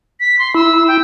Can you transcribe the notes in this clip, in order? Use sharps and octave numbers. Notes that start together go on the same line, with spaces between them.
B6
C6
E4 E6
G5